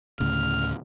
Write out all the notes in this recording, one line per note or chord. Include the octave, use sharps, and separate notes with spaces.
D2 A2 C#3 F6